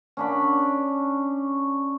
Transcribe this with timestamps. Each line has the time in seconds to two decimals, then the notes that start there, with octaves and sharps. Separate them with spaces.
0.17 C#4 D4 B5